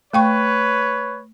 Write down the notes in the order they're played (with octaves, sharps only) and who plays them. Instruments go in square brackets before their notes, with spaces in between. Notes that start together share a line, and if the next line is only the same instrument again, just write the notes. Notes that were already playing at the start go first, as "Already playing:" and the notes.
[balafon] A3 G5 C#6 [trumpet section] B4 C#5